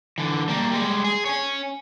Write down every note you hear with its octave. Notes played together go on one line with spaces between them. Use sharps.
D3 E3
G3 A#3
G3 G#3
G#4
C#5 G#5